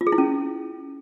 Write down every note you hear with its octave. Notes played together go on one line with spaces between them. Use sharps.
F4
G#4
E4
C#4